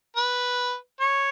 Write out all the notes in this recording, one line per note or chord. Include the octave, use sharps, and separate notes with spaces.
B4
C#5